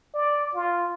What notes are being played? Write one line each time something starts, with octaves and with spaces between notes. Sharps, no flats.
D5
F4